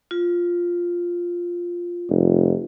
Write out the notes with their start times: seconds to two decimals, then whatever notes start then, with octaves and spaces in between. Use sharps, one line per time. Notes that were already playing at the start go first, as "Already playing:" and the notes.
0.11 F4
2.09 F1